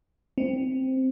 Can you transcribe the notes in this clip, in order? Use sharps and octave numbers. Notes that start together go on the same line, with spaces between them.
C4